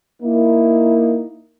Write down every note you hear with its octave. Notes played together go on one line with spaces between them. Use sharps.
A#3 D#4 E4